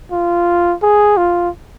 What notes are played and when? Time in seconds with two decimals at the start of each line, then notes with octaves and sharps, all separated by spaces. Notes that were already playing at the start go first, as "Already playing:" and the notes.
0.11 F4
0.82 G#4
1.17 F4